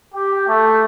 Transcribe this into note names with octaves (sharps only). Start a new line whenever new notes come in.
G4
A3